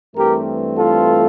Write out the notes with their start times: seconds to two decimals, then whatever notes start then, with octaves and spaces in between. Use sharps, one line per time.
0.15 G2 E3 A3 C4 G4 A#4
0.77 F4 A4